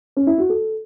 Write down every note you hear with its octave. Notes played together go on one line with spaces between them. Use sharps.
C#4
E4
F#4
A4